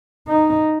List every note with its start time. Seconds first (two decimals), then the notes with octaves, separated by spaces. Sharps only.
0.28 D#4